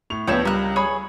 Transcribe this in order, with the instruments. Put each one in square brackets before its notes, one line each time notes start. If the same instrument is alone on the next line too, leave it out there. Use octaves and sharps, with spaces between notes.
[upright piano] A2 C#6 F7
[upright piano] C#2 D4 E7 [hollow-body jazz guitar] F3 B3 [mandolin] A4 C#5 G5
[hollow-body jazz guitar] G3 [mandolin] A#4 F#6
[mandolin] G#4 C#5 B5